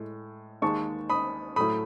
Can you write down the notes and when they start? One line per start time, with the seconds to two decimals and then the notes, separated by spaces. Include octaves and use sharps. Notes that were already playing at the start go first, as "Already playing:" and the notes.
Already playing: A2 G#3
0.62 D#2 D#3 G#3 A5 C#6
1.10 B5 D#6
1.56 A2 F#3 A3 B5 D#6